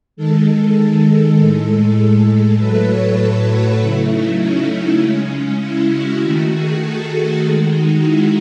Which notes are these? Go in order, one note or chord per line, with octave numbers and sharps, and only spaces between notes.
D#3 G#3 A4
A2 G#3
A2 F#3 A3 B4
C#5
B4
F#4
C#3 F#3 A3 E4
D#4
C#4
C#3 G#3 C#4
E4
F#4
D#3 A3 F#4
G#4
A4
D#3 G#3 F#4
D#4
E4